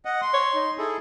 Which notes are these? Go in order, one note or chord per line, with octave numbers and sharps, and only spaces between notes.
D#5 F#5
C6
C#5
D#4
E4 G#4 A4